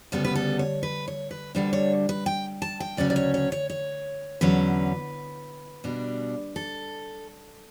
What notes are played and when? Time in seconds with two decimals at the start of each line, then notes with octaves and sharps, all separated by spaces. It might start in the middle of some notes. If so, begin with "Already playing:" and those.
0.12 D2 C#3 G3 B3 A4
0.25 B4
0.36 A4
0.59 C#5
0.83 B4
1.08 C#5
1.31 B4
1.55 D2 D3 G3 D4 B4
1.73 C#5
2.09 B4
2.26 G5
2.62 A5
2.80 G5
2.97 D2 C#3 F#3 C#4 D5
3.10 D5
3.16 C#5
3.34 C#5
3.52 C#5
3.70 C#5
4.41 E2 D3 F#3 C#4 B4
5.84 B2 G3 D4
6.56 A4